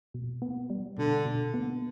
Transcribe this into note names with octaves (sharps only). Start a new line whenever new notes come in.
B2
B3
G3
B2 D3
B2
B3